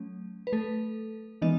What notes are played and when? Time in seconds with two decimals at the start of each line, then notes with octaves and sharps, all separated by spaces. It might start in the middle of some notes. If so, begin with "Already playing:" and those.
Already playing: F#3 A3 C#4
0.47 B4
0.52 A3 A4
1.42 E3 G#3 B3 D#4 D#5